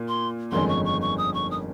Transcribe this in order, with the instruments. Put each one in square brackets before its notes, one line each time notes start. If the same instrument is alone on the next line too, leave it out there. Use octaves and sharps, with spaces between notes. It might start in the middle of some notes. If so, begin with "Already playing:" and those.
Already playing: [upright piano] A#2 F4
[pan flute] C6
[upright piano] G1 F2 D#3 G#3 C#4 [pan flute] C6
[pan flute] C#6
C#6
C#6
D#6
C#6
D#6